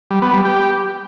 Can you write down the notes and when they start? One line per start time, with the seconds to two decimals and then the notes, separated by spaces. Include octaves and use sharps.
0.11 G3
0.22 B3
0.34 G3
0.45 G4